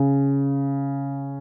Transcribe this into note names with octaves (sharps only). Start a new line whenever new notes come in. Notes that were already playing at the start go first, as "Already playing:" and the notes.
Already playing: C#3